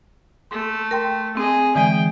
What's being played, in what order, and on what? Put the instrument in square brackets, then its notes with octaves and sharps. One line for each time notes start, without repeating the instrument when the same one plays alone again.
[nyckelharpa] A3 [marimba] C6
[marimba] A#4 G5 C6
[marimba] C4 [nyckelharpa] G#4 D#5
[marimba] D3 E3 G#3 [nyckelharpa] G#4 G5